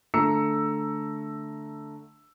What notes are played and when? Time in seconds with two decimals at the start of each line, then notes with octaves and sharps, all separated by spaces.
0.14 D3 A3 A#5 E6 C#7